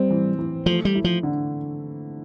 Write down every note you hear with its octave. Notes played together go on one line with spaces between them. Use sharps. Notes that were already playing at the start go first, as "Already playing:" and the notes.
Already playing: G3 C4
E3
E3
F3 A3
G3
E4
F3
D3